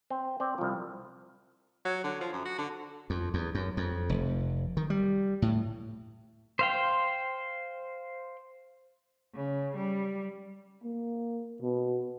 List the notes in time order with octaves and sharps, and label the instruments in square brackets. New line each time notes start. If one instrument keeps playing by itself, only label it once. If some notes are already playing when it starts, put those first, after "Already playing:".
[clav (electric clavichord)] C4
C4 D5
C2 F3
[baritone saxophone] F#3
D3
F3
F#2
F#4
D3
[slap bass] F2
E2
F#2
F2
F1
D#3
G3
A2
[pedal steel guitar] C5 F5 G5
[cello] C#3
G3
[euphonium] A#3
B2